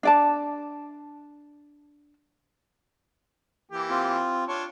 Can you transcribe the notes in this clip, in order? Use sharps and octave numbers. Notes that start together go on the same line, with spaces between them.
D4 D5 A5
E3 A#3 G4
C4 F4
D4 F4 C#5